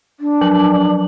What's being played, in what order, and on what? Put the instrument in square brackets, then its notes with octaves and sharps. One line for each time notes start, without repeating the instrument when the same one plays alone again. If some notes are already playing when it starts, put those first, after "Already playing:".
[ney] D4
[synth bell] F3 F#3 F#7